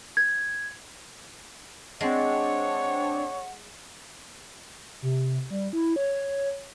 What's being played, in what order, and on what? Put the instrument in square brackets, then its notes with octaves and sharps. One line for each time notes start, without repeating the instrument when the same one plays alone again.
[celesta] G#6
[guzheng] G#3 [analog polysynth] C4 D4 [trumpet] C#5 [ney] F#5
[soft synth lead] C3
G3
E4
C#5